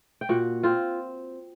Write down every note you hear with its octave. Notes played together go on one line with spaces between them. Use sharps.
G5
A#2 F#4 F#5
C4 F4